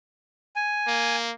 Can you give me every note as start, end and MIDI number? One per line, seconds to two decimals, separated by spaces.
0.56 1.16 80
0.87 1.33 58